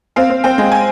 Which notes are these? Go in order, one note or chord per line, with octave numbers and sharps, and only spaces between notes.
C4 F5
C4
C4 G5
G#3
G#5